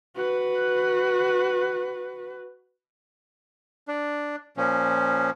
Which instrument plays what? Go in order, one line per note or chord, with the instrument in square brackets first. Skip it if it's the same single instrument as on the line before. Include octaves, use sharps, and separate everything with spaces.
[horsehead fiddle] F#4 B4
[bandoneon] D4
A#2 F3 C#4